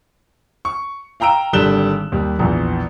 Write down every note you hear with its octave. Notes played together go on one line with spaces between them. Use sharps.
C#6
F5 G5 A#5 E6 D7
G#1 D3 G3 F#6 E7 G7
D#2 G3
A#1 E2